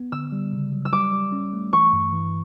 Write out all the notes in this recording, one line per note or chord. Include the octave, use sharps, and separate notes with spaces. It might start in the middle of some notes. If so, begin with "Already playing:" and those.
Already playing: B3
D3 E6
G3
C#3
F#3
E6
G3 D6
G3
C#4
A3
E3 C#6
G2
E3